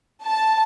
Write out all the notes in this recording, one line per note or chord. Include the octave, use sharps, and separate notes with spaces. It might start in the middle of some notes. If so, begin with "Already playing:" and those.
A5